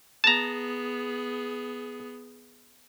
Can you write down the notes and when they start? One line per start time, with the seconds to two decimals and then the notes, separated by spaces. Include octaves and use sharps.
0.24 B3 G#4 A5 A#5